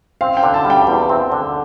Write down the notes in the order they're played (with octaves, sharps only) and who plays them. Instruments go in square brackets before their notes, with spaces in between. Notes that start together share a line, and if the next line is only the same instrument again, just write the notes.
[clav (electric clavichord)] C4 [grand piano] F5
[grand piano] G5
[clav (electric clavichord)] D3
[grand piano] A5
[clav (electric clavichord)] G3
[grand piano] G5
[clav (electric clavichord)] E2
C4
D3